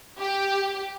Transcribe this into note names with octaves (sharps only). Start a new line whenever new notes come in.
G4